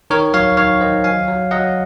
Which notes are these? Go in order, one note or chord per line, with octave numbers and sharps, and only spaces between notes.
D#3 A#4 C#5
F#3 C#5 F5
D#3 C#5 F5
D#3 C5 D#5
F#3 F5 G#5
F#3
F#3 D#5 F#5